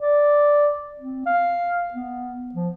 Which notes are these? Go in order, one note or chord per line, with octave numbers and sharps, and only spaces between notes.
D5
C4
F5
B3
F3